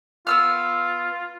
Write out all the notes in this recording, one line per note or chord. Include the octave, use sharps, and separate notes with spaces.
B3 F4 E6 F6